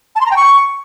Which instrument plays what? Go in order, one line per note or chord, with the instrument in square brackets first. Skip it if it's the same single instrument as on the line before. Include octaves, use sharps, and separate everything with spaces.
[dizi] A5
C6
A#5
G5
C#6